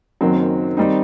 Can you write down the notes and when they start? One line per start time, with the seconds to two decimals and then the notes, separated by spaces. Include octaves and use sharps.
0.21 F#1 F#2 D#3 F#3 C4
0.77 D#3 G3 C4 D#4